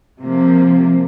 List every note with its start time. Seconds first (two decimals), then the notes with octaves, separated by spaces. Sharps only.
0.19 C3 F3 A#3